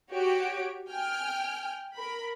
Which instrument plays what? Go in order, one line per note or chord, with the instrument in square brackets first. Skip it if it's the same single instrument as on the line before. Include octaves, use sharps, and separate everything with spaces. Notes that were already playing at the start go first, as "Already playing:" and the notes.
[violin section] F#4 G4 C#5 D7
G5 G#5 F6
A#4 B5